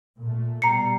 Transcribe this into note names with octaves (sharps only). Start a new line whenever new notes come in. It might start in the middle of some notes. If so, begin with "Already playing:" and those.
A#2 A3
B2 G3 A#5 C7 C#7